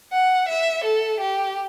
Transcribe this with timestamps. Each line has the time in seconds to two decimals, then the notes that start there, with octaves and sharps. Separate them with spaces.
0.12 F#5
0.48 E5
0.84 A4
1.20 G4